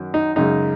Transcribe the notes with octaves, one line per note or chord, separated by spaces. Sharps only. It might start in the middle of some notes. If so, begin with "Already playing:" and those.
Already playing: F#2 D#3 F#3
D#4
F#2 C#3 G#3 D#4